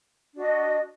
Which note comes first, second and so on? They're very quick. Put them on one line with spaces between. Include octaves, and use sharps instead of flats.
D4 F#4 D#5